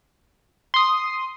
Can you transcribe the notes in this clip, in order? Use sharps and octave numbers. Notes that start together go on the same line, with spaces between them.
C6 D#6